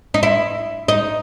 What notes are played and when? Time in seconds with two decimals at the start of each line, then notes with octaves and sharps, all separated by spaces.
0.14 D#4
0.23 E4
0.88 D#4